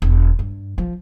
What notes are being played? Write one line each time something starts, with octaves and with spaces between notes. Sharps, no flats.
E1
G2
F3